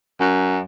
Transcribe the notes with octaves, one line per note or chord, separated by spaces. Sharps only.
F#2